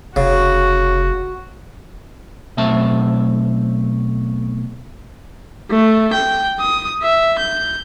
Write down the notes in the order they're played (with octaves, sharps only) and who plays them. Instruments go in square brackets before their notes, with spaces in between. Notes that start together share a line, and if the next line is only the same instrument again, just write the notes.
[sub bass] F1 [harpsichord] C#3 [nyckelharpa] F#4
[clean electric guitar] B1 B2 A3 C4 E5 A5
[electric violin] A3
G5
D#6
E5
G6